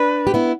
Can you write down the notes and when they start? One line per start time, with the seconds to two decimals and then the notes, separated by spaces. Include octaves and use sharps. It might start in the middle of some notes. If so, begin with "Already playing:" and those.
Already playing: D4 B4
0.27 G4
0.34 B3 E4